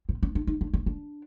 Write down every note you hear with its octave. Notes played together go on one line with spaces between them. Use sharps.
C4
C#4
D4
D#4
D4
C#4
D4